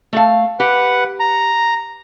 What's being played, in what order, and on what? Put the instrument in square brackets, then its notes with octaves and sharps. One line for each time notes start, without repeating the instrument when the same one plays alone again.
[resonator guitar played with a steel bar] A3 A4 F5
[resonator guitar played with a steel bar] G4 [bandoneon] B4 F#5
[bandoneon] A#5